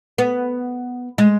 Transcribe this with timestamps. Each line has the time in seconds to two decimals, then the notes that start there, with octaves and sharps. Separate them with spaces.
0.18 B3
1.18 G#3